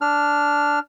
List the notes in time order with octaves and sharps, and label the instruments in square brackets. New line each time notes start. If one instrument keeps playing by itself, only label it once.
[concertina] D4 F6